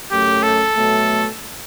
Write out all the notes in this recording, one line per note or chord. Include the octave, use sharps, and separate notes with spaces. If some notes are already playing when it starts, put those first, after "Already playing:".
F#2 F#3 A3 G4
A4
B2 F#3 A3